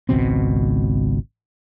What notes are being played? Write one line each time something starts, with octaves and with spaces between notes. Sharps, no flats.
G#1 C#2 B2 C4